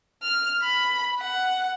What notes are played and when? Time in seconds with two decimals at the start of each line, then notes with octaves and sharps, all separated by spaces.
0.23 F6
0.63 B5
1.18 F#5